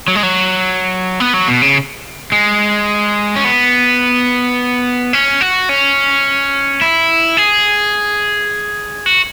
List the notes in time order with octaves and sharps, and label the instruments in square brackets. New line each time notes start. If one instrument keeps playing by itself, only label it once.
[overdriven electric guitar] F#3
G#3
F#3
B3
F#3
B2
C#3
G#3
C#4
B3
C#4
F#4
C#4
E4
G#4
F#4